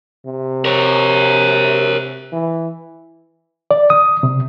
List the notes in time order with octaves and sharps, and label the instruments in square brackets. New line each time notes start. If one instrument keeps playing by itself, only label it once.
[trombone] C3
[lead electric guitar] A#4 C#5
[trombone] E3
[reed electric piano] D5
D#6
C3